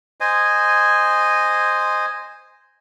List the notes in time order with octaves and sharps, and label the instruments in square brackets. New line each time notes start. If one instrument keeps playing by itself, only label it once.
[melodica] C5 D#5 G#5